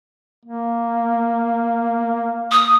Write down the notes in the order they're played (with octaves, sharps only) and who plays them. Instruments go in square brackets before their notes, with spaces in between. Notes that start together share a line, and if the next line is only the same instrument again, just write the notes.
[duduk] A#3
[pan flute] D#6